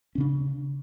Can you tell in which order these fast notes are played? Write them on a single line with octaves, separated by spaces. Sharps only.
C#4 C#3 D4